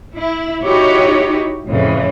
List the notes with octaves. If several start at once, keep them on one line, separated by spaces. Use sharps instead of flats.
E4
D#4 E4 F#4 G4 C#5
F2 A2 C#3 E3